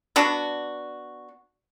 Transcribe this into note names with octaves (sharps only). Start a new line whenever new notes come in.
B3 D4 F#4